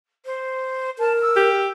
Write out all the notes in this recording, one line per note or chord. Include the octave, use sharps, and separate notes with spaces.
C5
A#4 A5
E6
G4